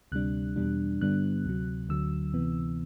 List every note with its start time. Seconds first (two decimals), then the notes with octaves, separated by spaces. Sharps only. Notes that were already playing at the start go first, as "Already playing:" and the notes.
0.12 D2 C3 G3 D4 F#6
0.56 E2 B2 G3 D4
1.01 G2 D3 G3 B3 D4 F#6
1.45 D2 C3 F#3
1.89 D2 D3 F#3 E6
2.34 D2 C3 E3 B3